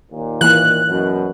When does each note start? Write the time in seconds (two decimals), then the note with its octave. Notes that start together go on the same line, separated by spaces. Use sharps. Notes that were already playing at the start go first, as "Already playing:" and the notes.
0.12 D#2 A#2
0.41 E3 A#3 F#6
0.87 F#2 B2